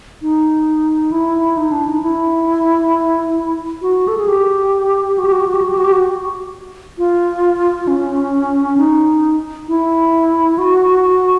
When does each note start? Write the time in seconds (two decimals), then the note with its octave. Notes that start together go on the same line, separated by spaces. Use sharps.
0.22 D#4
1.12 E4
1.57 D#4
1.72 D4
1.88 D#4
2.02 E4
3.82 F#4
4.08 A4
4.18 G#4
4.28 G4
5.18 F#4
5.25 G4
5.32 F#4
5.40 G4
5.48 F#4
5.55 G4
5.62 F#4
5.71 G4
5.78 F#4
5.84 G4
5.93 F#4
6.98 F4
7.87 C#4
8.77 D#4
9.68 E4
10.58 F#4